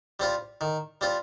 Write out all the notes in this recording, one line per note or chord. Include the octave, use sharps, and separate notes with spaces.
G3 C4 F4
D#3
G3 C4 F4